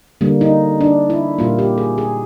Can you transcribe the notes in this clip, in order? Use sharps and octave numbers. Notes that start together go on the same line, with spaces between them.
D3 G3 A#3
D#4
D4
E4
A#2 G3 A#3 F4
G4
G#4
G#4